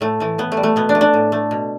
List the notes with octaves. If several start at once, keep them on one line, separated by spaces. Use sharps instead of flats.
A2 A3
E3 A3
A2 B3
A3
G3
A3
B2 B3
D4
A3
D4
A2
A3
B2